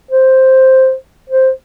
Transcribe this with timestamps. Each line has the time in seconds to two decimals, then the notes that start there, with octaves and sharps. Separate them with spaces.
0.11 C5
1.29 C5